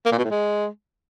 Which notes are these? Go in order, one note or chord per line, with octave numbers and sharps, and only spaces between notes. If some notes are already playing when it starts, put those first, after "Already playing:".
A#3
A#2
B2
A2
G#3